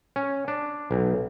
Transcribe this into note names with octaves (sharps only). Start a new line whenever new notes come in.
C#4
D4
B1